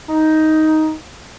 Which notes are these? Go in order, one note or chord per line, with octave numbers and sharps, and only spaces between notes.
D#4